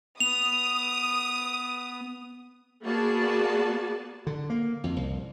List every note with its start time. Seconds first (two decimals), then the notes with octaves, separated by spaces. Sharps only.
0.20 B3 D#6 F7
2.83 A#3 B3 F#4 G#4 D5 A5
4.27 D3
4.50 A#3
4.84 F2
4.96 C2